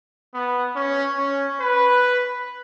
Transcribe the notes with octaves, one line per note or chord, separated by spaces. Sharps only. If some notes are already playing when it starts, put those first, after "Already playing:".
B3
C#4
C#4
B4